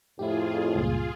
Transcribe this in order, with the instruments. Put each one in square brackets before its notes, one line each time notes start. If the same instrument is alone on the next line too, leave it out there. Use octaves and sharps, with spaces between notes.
[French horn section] F2 A2 [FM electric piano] E4 G4 [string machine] F4 G#4
[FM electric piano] C#2 G2 A#2